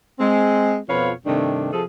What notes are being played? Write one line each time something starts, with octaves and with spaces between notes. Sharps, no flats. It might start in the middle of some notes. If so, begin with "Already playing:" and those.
G#3 C4
F2 B2 F3 B4 C#5 F5
G2 C3 D#3 A3 D4
C3 F3 G#4 A4